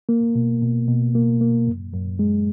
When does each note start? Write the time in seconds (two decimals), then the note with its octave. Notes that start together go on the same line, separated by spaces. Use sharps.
0.09 A#3
0.35 B2
0.62 B2
0.88 B2
1.15 A#3
1.41 A#3
1.67 F#2
1.94 F#2
2.19 G#3